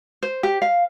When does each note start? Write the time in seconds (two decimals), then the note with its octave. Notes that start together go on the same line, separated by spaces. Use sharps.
0.23 C5
0.43 G4
0.62 F5